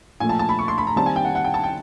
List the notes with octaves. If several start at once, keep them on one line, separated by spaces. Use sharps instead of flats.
A#2 F3 A3 G#5
A5
A5
B5
C#6
C6
B5
A#5
D#3 G3 C4 A5
G#5
G5
F#5
F#5
G5
A5
G5